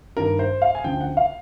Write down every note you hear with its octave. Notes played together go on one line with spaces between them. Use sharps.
G2 D#3 A#4
C5
F5
G#5
D2 C#3 F3 G5
F#5
F5